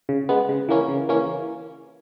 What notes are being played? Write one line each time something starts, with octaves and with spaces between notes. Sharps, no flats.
C#3
G#3 B3
C#3
E3 A#3 C#4
C#3
E3 A#3 C#4